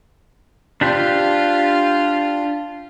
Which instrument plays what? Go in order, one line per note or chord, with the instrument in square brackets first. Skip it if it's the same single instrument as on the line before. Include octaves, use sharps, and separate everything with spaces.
[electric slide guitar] D4 G4 C5 [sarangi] F4